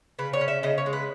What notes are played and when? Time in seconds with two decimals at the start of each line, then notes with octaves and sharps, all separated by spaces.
0.19 C#3 B4
0.33 C#5
0.41 C#4
0.48 E5
0.63 C#3 D#5
0.78 C#5
0.86 G#3
0.93 B4